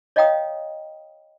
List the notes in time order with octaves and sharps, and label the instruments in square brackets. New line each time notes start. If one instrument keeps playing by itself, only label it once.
[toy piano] C#5 D#5 F5 G5 A#5 D#6